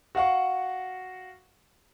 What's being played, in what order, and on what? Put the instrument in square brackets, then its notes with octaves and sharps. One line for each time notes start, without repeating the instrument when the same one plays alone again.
[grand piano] F#4 F5 F#5 C#6